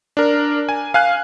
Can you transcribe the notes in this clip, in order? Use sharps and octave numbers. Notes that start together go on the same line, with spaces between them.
D4 A#4
G#5
F5 G#5 F#6